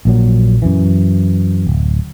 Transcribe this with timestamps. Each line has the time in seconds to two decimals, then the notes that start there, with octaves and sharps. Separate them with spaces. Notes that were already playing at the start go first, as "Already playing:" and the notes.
0.05 A#1 A#2 F#3
0.62 F#2 E3
1.67 D1